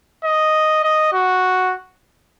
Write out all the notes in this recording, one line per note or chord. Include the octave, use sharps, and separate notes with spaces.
D#5
D#5
F#4